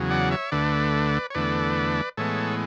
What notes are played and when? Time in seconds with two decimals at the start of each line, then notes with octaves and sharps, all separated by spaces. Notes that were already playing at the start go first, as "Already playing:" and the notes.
Already playing: E2 C#3 F#3
0.10 D5 F#5
0.31 C#5 E5
0.52 D2 D3 A3 B4 D5
1.30 C#5
1.35 E2 D3 A3 B4 D5
2.17 A2 E3 G#3 B3 A4 C#5